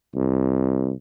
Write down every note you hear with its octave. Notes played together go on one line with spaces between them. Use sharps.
C2